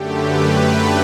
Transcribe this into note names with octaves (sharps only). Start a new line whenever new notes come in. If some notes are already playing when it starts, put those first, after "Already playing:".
Already playing: F#2 D3 A3 G4
B4